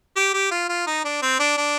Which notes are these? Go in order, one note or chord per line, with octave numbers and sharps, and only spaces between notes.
G4
G4
F4
F4
D#4
D4
C4
D4
D4